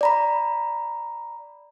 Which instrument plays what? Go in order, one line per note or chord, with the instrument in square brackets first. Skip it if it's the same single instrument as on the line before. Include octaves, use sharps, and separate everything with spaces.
[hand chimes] D5 A#5 B5